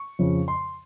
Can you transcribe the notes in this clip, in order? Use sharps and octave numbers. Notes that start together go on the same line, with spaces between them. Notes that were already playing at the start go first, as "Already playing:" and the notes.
Already playing: C#6
F2 C#3 F3
C6